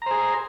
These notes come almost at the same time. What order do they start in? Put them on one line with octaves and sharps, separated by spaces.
A#5 C5 G#4